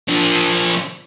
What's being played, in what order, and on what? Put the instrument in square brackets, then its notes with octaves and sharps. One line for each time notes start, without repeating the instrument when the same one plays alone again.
[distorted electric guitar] F3 D4